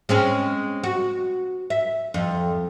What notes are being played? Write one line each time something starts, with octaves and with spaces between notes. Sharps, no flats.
G#3 C4 C#4
F#4
E5
F2